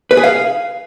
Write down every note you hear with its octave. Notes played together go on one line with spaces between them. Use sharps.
B4
G#4
F5